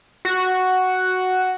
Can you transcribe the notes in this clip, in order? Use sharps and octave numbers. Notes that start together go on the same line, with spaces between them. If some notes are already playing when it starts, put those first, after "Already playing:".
F#4